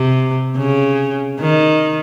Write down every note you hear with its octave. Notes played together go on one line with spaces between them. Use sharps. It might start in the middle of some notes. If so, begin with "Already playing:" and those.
Already playing: C3
C#3
D#3